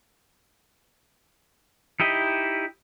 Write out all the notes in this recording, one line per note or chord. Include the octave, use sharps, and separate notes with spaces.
D#4 E4 G4 D#5